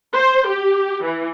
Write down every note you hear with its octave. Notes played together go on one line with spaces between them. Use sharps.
C5
G4
E3